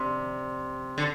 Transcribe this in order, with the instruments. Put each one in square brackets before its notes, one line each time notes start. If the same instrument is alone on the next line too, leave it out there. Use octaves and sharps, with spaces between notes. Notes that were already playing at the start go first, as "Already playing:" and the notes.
Already playing: [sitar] C3 [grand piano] C4 D4
[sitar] D3